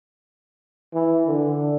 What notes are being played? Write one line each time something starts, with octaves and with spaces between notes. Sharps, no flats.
E3
D3